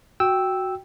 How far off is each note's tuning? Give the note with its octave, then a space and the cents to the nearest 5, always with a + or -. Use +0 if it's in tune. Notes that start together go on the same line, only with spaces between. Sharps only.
F#4 +0 G5 +0 E6 -5